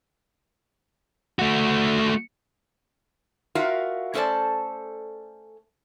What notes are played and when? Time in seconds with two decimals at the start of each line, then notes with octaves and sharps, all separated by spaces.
1.39 A3 F#4
3.55 F4 F#4 A#4 E5 F5
4.14 A3 C#4 A4 C5 D5 A5